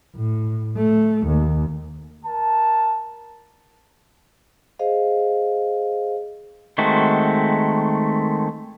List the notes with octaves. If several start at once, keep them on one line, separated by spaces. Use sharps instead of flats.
A2
A3
D#2
A#4 A5
G#4 C5 D#5 F5
D#3 G#3 A3 C4 F#4